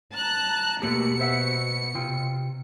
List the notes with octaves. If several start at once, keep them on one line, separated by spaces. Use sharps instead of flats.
A5 A#5 F#6
B2 A3 A#3 G4 C#7
C5 E5 F#5
C3 F4 G5